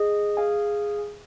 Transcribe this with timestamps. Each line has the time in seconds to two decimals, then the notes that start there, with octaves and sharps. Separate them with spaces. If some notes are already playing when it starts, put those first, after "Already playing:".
Already playing: G#4 D#5
0.37 G#4 F5 G#5